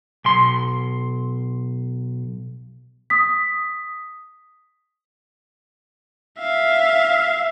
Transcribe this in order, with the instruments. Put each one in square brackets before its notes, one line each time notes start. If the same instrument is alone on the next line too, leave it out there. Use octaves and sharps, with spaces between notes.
[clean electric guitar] B1 C6
[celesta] D#6 B6
[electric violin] E5 F5